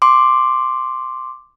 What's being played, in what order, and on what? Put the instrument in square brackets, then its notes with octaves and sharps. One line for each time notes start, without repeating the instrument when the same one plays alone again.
[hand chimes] C6 D6